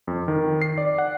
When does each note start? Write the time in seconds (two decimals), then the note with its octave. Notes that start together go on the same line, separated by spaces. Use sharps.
0.07 F2
0.28 D#3
0.62 C7
0.78 D5
0.98 F#5